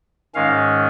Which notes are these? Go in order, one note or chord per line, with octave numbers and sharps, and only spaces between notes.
G#2 D#3 G#3 C#4 F5